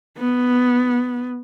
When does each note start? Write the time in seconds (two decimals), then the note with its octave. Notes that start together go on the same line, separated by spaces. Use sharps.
0.18 B3